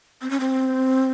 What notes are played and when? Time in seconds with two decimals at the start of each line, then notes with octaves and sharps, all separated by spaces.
0.22 C4
0.30 C#4
0.40 C4